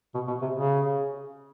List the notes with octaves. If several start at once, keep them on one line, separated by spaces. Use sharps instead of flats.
B2
B2
C3
C#3